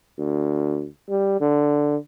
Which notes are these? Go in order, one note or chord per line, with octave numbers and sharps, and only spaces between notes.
D2
G3
D3